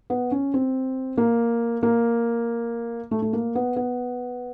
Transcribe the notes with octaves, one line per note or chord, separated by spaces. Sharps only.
B3
C#4
C4
A#3
A#3
A3
A3
A#3
B3
B3